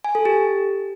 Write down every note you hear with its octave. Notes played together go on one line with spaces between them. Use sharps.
G#5
A4
G4